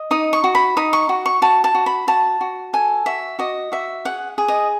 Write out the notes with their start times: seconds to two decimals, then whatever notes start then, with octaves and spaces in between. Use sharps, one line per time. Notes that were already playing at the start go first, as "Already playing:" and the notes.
Already playing: D#5
0.11 D#4 D#6
0.33 C#6
0.44 F#4
0.55 B5
0.77 D#4 D#6
0.93 C#6
1.09 F#4
1.26 C#6
1.42 F#4 A5
1.64 A5
1.75 F#4
1.86 B5
2.07 F#4 A5
2.41 F#4
2.73 A4 G#5
3.06 F#4 E5
3.39 F#4 D#5
3.72 F#4 E5
4.05 G#4 F#5
4.38 G#4
4.48 D#5